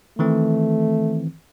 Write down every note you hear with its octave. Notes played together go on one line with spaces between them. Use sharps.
D#3 E3 A3 C4